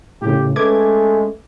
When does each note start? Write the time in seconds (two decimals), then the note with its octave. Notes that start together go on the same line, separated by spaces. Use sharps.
0.22 A2 C#3 G4
0.56 G#3 A3 C#4 B4 D6 G#6